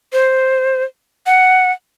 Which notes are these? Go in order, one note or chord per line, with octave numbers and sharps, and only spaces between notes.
C5
F#5